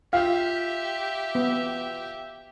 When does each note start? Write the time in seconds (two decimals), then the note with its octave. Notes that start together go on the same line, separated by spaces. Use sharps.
0.13 F4 G4 E5 F5 G5
1.35 B3